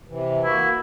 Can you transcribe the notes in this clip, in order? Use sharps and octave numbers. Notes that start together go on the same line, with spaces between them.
C3 E3
A#3 E4 F#4